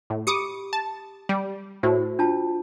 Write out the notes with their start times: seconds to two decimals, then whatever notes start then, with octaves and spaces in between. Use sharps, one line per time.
0.10 A2
0.27 G4 B5 D6 D#6 C#7
0.73 A5
1.29 G3
1.83 A2 F#4 C5
2.19 D4 F4 A5